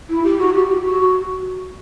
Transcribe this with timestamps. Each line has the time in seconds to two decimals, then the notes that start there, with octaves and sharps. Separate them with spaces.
0.09 E4
0.24 G4
0.39 F#4
0.54 G4
0.84 F#4